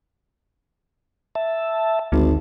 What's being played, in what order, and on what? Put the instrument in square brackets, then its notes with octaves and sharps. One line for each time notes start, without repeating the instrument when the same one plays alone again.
[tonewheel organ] E5 A5
[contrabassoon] G#1 [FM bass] D2